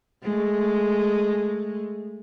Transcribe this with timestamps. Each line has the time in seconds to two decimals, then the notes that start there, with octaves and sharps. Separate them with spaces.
0.23 G#3 A3